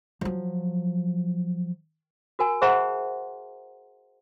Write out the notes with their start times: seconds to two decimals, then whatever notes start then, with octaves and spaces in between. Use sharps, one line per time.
0.21 F3 F#3
2.39 F#4 A#4 G#5
2.62 G#4 C5 E5 F#5 A#5 C6